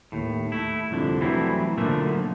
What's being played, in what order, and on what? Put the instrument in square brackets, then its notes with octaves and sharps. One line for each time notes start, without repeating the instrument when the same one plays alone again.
[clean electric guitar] D#2 A2
A3 E4
C2 F2 D3
E3 F#3 G3 A3 C4 E4
B1 D3 F3 A3 A#3 E5